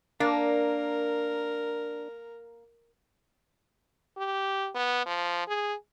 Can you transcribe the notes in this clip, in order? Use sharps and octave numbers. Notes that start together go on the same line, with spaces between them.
A#3 D4 A#4
G4
B3
F3
G#4